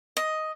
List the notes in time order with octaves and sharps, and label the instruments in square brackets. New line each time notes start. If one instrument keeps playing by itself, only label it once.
[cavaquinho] D#5